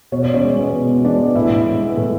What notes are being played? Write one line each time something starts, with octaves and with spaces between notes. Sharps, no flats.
B2 C#5
B2 D5
C#4 C#5
G#3
B3
B2
B2
G#3 D4 D5
B3
A2 E4 E5
A2
G#3
B3
A2